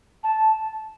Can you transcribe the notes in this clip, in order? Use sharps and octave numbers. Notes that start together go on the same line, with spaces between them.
A5